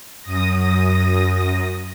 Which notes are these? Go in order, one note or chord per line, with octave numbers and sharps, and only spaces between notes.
F#2 D#6 A#6